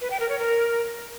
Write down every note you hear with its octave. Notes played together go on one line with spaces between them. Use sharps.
B4
G5
A#4
C#5
A#4